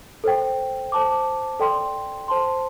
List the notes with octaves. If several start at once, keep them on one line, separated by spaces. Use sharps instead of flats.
A4 C5 G5
C5 A5 D6
A4 D5 G5 C6
C5 A5 C6